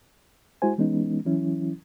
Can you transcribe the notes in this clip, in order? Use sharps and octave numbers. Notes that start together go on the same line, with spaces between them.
G#3 E4 F#4 C5 G#5
E3 G#3 B3 C#4 D#4
E3 F#3 C#4 E4